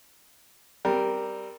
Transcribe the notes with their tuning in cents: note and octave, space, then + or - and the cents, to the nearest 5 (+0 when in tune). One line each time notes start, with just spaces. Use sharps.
G3 +0 C4 +0 A#4 +0